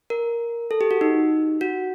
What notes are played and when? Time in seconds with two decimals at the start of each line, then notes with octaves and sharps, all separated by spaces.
0.10 A#4
0.71 A4
0.81 G4
0.91 F#4
1.01 D#4
1.61 F#4